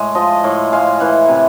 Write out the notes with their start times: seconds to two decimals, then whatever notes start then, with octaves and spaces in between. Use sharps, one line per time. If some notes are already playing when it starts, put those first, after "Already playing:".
Already playing: A2 G#3
0.15 F3 D#5
0.44 A2
0.72 G#3 F5
1.00 E3 F#5
1.29 C3